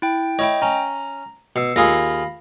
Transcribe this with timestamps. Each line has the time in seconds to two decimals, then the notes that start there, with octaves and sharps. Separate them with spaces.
0.02 E4 G5
0.39 E4 C#5 D#5 G5
0.62 C#4 A#5
1.56 B2 E6 C7 C#7
1.76 D#2 F4 G#4 F5 B5 A#6